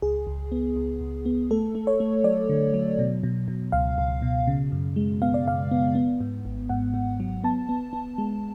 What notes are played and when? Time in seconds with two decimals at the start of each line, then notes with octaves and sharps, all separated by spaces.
0.02 C#2 G#4
0.27 C#2
0.52 B3
0.76 C#2
1.01 C#2
1.26 B3
1.51 A3 A4
1.75 A3
1.87 C#5
2.00 A3
2.24 F#3 D5
2.49 D3
2.74 F#3
2.99 B2
3.23 B2
3.48 B2
3.72 C#2 F5
3.98 C#2
4.22 B2
4.47 C#3
4.72 F#2
4.96 G#3
5.22 B3 F5
5.34 D5
5.46 F#2 F5
5.71 B3
5.95 B3
6.20 G#2
6.45 G#1
6.69 G#2 F#5
6.94 G#2
7.20 F#3
7.44 B3 A5
7.69 B3
7.93 B3
8.18 G#3